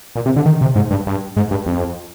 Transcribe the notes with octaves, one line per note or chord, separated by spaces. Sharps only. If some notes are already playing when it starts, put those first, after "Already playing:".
A#2
C3
D3
D#3
C3
G#2
G2
G2
G#2
G2
F2